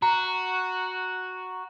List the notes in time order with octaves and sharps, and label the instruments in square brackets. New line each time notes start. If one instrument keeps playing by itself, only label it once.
[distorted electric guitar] F#4 [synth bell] A#5